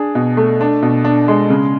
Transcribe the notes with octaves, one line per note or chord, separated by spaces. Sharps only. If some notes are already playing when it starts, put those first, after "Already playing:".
Already playing: D4 G#4
B2
A3
D4
B2
D4
G#3
C#3